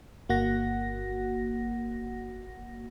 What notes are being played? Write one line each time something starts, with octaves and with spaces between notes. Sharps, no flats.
G1 A#3 F#4 F#5 A#6